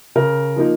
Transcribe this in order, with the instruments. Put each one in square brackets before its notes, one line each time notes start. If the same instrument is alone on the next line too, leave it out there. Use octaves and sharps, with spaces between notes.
[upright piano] C#3 A#4
F3 A#3 D#4